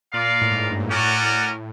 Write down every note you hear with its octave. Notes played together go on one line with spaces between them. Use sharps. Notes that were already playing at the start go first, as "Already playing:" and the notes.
A#2 F4 A#4 D5 F5
A#2
A2
G#2
G2
A#2
A2 C#4 F#4 A#4 D5 F#5